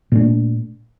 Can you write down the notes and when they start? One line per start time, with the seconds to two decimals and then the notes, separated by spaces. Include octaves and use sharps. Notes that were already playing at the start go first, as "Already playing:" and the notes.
0.12 A#2 A3 D4